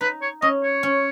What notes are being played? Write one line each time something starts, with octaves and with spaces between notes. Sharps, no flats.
D#4 B4
C#5
C#4 D#5
C#5
C#4